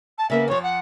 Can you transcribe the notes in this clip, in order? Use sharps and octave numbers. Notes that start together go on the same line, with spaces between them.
A5
C#3 A#3 B3 E5
F2 F3 C#5
F#5